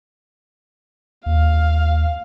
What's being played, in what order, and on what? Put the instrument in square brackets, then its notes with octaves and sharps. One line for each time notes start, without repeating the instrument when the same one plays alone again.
[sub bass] D#2 [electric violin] F5